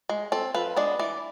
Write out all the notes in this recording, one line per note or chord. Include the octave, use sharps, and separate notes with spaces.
G#3
C4 A4
F3 B4
G#3 B3 D4 D5
E3 D5